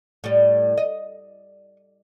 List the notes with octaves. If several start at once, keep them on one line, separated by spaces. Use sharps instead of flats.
A2 G3
D#5